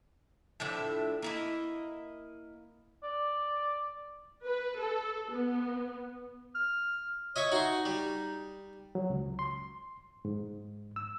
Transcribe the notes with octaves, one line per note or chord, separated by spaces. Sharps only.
A2 F3 D4 E5
A#3 E4 D#5
D5
B4
A4
B3
F6
C#5 D#5 E5 C#6
D#4 F#4 C6
G3
F#3
C#2
C6
G#2
E6